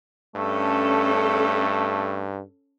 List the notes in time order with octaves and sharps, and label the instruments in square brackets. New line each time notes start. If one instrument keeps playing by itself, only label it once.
[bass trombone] G2 [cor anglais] A3 [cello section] C#4 A4